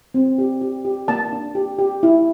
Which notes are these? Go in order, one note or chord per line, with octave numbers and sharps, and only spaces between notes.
C4
G4
G4
G4
A#3 A5
D4
G4
G4
E4